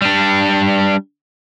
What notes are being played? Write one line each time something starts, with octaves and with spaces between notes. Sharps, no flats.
G3 D4